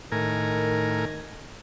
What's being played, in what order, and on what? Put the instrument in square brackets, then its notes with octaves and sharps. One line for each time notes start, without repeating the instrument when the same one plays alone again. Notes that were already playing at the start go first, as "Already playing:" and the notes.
[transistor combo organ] A2 A#4 G#5 [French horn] D#3